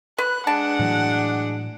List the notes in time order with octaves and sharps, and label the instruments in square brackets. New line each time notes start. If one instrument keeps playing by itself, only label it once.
[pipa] B4 [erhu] F#6
[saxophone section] G#3 D4 [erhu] F#5 [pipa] A5
[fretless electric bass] A2 E3 F#3